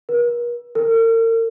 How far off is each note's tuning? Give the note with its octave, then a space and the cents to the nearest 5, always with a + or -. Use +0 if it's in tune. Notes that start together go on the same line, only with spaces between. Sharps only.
A#4 +45
A#4 -40